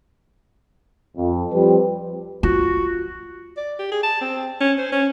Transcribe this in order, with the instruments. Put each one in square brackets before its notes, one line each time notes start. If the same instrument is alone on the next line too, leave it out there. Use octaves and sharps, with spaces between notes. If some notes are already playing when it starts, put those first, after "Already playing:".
[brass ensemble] F2
F3 G3 C4 G4 B4
[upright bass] F4 [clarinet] F#4
[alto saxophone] D5
G4
G#4
A5
C4
C#4
C5
C#4